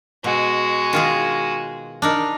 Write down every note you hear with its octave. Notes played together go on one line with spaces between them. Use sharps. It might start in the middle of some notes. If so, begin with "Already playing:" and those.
B2 G#3 F#4
D#3 F4 G#4
D4 D#4 A#4